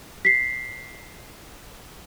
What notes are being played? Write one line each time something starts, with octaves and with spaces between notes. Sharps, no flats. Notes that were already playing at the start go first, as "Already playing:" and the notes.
B6 C7